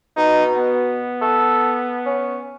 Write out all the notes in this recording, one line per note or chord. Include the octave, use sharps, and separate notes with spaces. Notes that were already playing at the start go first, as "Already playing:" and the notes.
B2 D#4
B3
A4
C#4